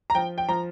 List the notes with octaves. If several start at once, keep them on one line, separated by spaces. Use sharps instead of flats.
A#5
F3 G5
G5
F3 A#5